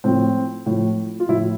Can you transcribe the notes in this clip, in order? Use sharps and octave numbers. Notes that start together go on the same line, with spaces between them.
A2 F3 C4
A2 F3
F4
A2 F3 E4